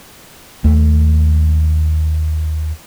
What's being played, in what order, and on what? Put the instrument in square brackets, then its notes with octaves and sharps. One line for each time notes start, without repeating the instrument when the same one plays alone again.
[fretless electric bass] D#2 A3